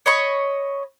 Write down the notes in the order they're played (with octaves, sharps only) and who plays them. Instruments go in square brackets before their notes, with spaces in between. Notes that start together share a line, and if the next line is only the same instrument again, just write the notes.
[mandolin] C#5 D#5 B5 C#6